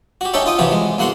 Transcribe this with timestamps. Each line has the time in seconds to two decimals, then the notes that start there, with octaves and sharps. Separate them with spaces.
0.21 F#4 G4
0.34 C#4 D#4 G4 A4 E5 C#6
0.46 D#4 F4 G5 D#6
0.58 C3 E3 F3 F#4 G4
0.72 G#3
0.98 E2 A#3 F#4 F#5 C6